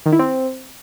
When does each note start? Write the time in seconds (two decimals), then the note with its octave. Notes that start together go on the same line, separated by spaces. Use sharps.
0.06 D#3
0.13 E4
0.19 C4